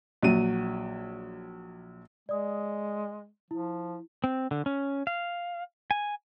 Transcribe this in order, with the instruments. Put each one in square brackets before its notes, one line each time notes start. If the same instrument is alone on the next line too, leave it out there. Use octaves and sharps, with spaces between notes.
[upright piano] A#1 F#3 D#7
[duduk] G#3 [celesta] D5 D#6
[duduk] F3 [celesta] E4
[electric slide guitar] C4
D3
C#4
F5
G#5